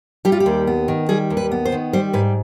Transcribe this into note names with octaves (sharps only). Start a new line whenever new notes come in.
G3 G4
F4
G4
D#2
B3
D#3
G3 G#4
D#2
B4
B3
C5
D#3
G3 C5
G#2 B4